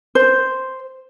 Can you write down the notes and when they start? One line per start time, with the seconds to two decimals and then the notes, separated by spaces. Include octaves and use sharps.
0.15 C5